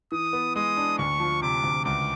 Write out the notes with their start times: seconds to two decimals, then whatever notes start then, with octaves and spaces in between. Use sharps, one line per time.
0.12 E3 D#6
0.33 B3
0.55 G#3 D#6
0.77 D4
0.98 D2 C#6
1.20 F3
1.42 C3 D6
1.64 D2
1.85 C#2 D6